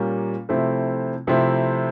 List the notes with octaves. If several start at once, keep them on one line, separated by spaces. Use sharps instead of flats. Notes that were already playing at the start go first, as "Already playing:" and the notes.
Already playing: A#2 G3 A#3 C#4
C3 F3 A3 C4 E4
C3 F3 A3 C4 E4